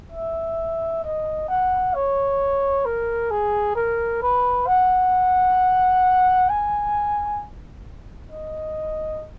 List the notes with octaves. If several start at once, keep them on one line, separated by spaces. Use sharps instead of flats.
E5
D#5
F#5
C#5
A#4
G#4
A#4
B4
F#5
G#5
D#5